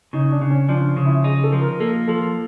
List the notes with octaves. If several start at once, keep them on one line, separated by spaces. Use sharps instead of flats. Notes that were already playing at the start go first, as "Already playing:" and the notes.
C#3 D#4
D4
C#3
C#4
F3 D4
C#3
E4
D#4 G#4
A4
F3
A#4
A#3 A4
F3 A4